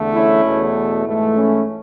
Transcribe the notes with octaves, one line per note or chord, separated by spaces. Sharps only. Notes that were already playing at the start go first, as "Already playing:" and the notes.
Already playing: E2 D3 A3
C#4 E4
E2 B2 A3
G#2 E3 A3
C#4 E4